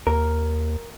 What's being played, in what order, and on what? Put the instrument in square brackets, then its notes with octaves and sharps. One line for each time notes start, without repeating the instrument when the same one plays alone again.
[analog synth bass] D#2 [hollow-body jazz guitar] A#4